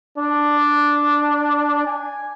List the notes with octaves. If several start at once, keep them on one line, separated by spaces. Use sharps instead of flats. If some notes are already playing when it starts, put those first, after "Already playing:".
D4
G#5